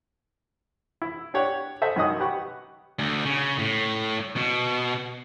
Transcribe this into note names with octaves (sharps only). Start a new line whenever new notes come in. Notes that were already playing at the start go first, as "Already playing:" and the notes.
E4
D4 G4 C#5 F#5
A4 C5 D#5 E5 F#5 A5
F#2 D#3 F#3 D#5 F#5 D#6
G4 B4 F#5 C#6
D2
C#3
A2
B2